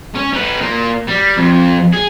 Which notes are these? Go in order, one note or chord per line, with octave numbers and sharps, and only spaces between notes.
C#4
D#4 B4
A#2 A#3
G3
F2
G#4